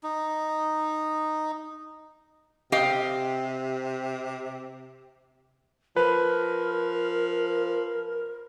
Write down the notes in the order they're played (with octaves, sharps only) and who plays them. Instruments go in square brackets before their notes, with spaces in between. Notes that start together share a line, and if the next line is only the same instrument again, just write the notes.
[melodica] D#4
[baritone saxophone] C3 [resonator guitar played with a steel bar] G4 D#5 F5
[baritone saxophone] F3 [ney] A#4 [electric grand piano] B4